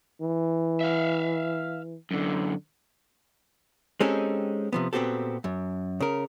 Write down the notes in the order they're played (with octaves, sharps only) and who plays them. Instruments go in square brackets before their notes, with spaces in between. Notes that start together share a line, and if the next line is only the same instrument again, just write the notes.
[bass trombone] E3
[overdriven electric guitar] E5 F5
F#2 D3
[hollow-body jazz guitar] G#3 C4 C#4 D#4 G4 A4
C3 F3 B3
A#2 B3 C4 F#4 G4 A4
F#2
C#3 A#4